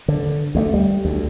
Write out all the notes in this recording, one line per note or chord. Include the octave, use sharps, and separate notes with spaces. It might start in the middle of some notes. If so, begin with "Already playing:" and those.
D3
D2 G#3 A3
G3
D2